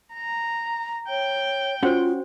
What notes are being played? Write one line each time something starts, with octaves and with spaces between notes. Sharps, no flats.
A#5
C#5 G5
C#4 F4 F#4 C5 F#5